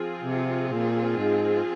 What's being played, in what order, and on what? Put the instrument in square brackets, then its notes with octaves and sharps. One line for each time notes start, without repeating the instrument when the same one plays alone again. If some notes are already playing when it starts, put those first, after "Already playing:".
Already playing: [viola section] F3 C4 F4 G#4
[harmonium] C3
A#2
G#2